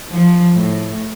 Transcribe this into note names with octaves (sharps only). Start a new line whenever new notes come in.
F3
A2